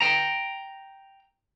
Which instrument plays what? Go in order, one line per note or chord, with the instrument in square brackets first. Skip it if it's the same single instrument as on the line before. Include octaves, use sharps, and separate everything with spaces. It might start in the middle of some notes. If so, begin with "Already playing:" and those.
[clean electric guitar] G5 A#5